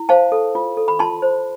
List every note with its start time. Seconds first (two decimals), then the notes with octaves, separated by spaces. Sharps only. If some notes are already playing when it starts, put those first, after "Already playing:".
Already playing: E4
0.09 C5 F5 A5
0.32 A4
0.55 F4
0.77 A4
0.88 B5
0.99 F4 A5 C6
1.22 C5